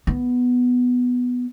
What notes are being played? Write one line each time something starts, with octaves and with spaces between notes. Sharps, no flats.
B3